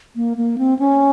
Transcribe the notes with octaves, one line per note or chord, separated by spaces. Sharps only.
A#3
A#3
C4
C#4